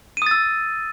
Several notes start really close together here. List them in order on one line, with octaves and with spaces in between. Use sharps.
D#7 D#6 A6 E6